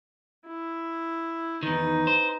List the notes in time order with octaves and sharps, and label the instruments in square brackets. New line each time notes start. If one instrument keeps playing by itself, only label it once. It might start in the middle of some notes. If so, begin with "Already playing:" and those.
[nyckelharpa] E4
[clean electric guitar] E2 D#3 [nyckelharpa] D#4 B4
[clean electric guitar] C5